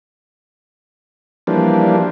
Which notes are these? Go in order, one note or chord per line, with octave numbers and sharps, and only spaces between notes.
E3 F3 G3 A#3 D4